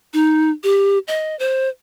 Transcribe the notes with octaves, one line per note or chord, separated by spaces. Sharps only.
D#4
G4
D#5
C5